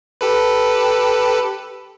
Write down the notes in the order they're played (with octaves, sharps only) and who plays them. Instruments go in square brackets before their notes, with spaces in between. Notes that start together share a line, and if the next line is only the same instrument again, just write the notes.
[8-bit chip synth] G4 A4 B4